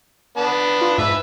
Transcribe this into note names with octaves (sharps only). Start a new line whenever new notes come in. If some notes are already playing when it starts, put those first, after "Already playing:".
B3 D4 A5
F4
G#2 B4 E5